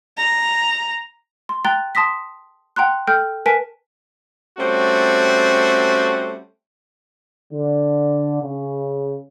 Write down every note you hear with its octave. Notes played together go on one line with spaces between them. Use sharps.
A#5
C6
G5 A#5 F#6 A6 G7
A5 C6 D#6 A#6 B6
F#5 G5 A#5 C6 F#6
A4 G5 F6 G6
A#4 B4 G#5 A5 B6 D7
G3 A3 C4 C#4 F#4
D3
C#3